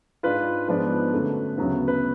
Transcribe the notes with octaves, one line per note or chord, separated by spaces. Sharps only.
G#2 G#3 D4 F4 B4
G#2 F3 G#3 B3 D4 B4
F#2 D3 F#3 A3
D2 C#3 F#3 B3
B4